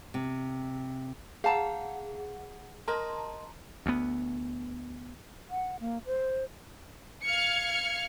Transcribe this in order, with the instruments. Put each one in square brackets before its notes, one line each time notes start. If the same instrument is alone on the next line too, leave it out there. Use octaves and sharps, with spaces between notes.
[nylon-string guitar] C3
[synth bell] G#4 F#5 [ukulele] F5 A5 A#5
[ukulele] A#4 D#5 [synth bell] A5 A#5 C6
[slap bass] D2 B3
[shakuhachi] F#5
A#3
C5
[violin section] F5 F6 G#6 C#7